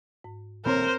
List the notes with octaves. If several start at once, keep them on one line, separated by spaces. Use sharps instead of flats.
G#2
D#1 A2 C3 C4 A#4 C5 C#5